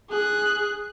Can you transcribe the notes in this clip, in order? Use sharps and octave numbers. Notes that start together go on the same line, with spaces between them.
G#4 F#6